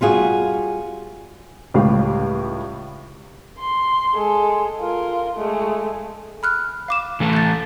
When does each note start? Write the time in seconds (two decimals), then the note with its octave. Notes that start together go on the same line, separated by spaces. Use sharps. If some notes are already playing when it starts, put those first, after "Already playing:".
0.01 G3 F4 F#4 G#4
1.74 C#2 A2 G3 G4 F5
3.58 C6
4.14 G#3 A4
4.80 F4 A#4
5.35 G#3 A3
6.43 B5 F6 F#6
6.88 F5 D6 E7
7.20 E3 A3 A4
7.33 G6 A6